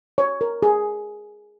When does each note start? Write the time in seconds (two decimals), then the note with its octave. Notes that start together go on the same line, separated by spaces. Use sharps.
0.18 C#5
0.41 A#4
0.63 G#4